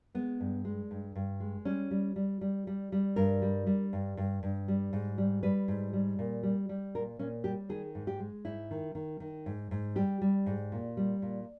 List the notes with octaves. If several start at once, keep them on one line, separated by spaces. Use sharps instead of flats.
G#3 B3
G2
G#3
G2
G2
G#3
G3 C#4
G3
G3
G3
G3
G3
G2 A#4
G3
G3
G2
G2
G2
G3
G#2
G3
G3 B4
G#2
G3
A#2
G3
G3
A#2 A#4
A#2 C#4
G3 G4
D#3 G#4
G#2
G4
G#3
G#2 E4
D#3
D#3
D#3
G#2
G#2
G3 G4
G3
G#2
A#2
G3
A#2